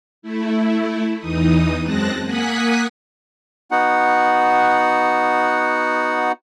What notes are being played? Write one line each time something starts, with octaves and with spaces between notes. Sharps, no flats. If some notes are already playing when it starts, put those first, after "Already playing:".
A3 E4
E2 E3 D#4 D#6
F#2 G#3 C4 A5 F#6 A#6
A#3 F#5 G#5 D#6 F#6 B6
B3 D#4 F#4 F#5